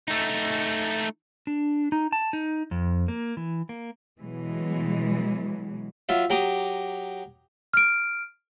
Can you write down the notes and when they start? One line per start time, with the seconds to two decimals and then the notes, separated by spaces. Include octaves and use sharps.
0.08 A3 D#4
1.47 D4
1.92 D#4
2.12 A5
2.33 D#4
2.71 F2
3.08 A#3
3.37 E3
3.69 A#3
4.20 B2 E3 F#3 G#3
6.09 F#3 F4 E5
6.30 F#3 G4 A#5 D6 D#6
7.74 F6 D7